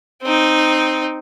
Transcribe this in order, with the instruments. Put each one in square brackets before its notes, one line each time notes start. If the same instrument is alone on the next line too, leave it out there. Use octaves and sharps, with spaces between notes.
[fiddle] C4 D#4